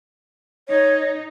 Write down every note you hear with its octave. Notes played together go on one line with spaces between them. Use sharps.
D#4 C#5